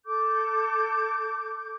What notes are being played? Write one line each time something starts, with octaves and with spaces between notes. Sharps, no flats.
A4 D6 G6